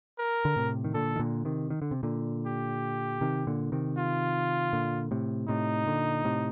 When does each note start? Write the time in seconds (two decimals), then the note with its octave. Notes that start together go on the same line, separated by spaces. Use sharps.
0.19 A#4
0.45 D3
0.56 A2 C3
0.84 D#3
0.94 A#2 D3 A4
1.16 D#3
1.19 A#2 D3
1.45 C3 D#3
1.70 D#3
1.82 D3
1.91 C3
2.03 A#2 D3
2.46 G4
3.21 C3 D#3
3.47 A#2 D3
3.72 C3 D#3
3.98 F4
4.73 A#2 D3
5.11 A2 C3
5.48 A2 C3 D#4
5.87 A#2 D3
6.25 A2 C3